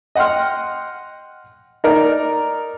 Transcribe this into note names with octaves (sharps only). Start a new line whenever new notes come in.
D#5 F#5 G5 C6 F6
D#4 A#4 D5